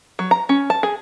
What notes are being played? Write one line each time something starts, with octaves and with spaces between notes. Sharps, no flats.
F#3
A#5
C#4
A5
G#4